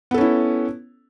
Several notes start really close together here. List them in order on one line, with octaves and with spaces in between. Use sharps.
B3 A4 C#4 E4